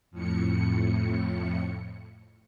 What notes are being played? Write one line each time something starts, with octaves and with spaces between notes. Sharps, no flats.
F2 A2 C#7